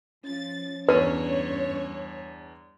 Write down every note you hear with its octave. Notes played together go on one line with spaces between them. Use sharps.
F3 C#4 A6
E2 G2 D4 B4 C#5 D#7